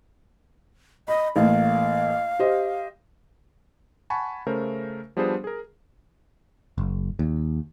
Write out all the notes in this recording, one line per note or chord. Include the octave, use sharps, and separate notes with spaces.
D#5 B5
A1 A#3 F5
G4 C5 D#5
F#5 G#5 A5 B5 C#6
C#3 A3 A#4 C5
F3 G3 B3 D4 G#4 C5
G#4 A#4
F#1
D#2